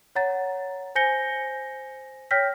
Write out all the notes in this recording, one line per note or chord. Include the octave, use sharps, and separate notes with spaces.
C#5 F#5 A#5 A6
C5 G#5 G6 A#6 C#7 G7
C#5 G5 F6 G6 A#6 B6